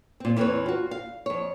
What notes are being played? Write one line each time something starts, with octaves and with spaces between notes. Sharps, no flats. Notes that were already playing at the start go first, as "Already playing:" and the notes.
A#2 C4
E2 E3 B3 C4 B4 C#5
F4 F#4
F5
F2 C#5